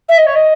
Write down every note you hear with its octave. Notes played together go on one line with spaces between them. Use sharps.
E5
D#5
C#5
D#5